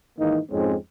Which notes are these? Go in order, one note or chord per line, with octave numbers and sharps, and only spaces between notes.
G#2 D#3 E3 A#3 D#4 A#4
F2 G#2 G#3 C4 C#4